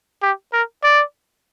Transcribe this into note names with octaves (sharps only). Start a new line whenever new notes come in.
G4
A#4
D5